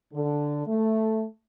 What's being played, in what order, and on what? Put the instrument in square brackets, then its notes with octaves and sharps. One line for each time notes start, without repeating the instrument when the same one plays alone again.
[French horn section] D3
A3